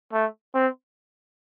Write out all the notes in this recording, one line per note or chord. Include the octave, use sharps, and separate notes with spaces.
A3
C4